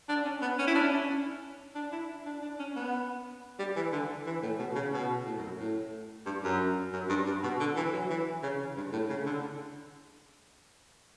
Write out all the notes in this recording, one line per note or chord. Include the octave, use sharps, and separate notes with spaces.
D4
C#4
B3
C#4
E4
D4
C#4
D4
E4
D4
D4
C#4
B3
G3
E3
D3
E3
A2
B2
C#3
B2
A2
F#2
A2
G2
F#2
F#2
G2
G2
B2
D3
E3
F#3
E3
C#3
G2
A2
C#3
D3